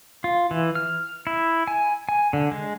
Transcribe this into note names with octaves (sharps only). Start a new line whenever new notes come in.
F4
E3
F6
E4
G#5
G#5
D3
G#3